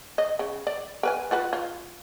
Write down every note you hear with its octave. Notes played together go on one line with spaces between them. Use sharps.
D#5
C#3
D5
A#4 B4 G#5
F4 F#4 B4
F4